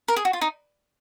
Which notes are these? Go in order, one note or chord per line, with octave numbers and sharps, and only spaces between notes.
A#4
G#4
F#4
F4
D#4